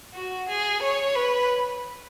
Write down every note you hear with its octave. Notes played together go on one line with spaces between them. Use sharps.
F#4
G#4
C#5
B4